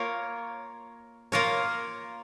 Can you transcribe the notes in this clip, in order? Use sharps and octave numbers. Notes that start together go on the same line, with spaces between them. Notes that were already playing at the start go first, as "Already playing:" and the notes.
Already playing: A#3 F4 A#4 C#5
A#3 F4 A#4 C#5